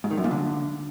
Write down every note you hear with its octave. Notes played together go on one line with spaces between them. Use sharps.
G#2
D#3
F#2
A#2
D3